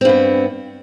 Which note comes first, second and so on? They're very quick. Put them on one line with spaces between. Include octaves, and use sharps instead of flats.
C4 G2 B3